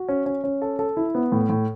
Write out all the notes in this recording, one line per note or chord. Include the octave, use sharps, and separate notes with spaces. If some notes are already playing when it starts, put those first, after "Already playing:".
Already playing: F#4
C#4
C#4
C#4
A4
A4
E4
B3
A2
A2